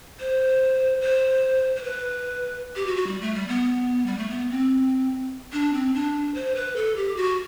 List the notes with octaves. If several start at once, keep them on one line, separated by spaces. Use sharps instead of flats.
C5
C5
C5
B4
G4
F#4
F#4
G3
A3
G3
B3
G3
A3
B3
C4
D4
C4
D4
C5
B4
A4
G4
F#4